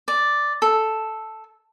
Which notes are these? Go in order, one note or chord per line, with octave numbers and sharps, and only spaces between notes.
D5
A4